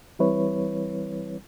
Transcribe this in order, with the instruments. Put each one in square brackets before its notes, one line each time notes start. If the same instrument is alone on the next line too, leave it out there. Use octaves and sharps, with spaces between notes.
[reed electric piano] E3 G3 C4 E4 B4 C#5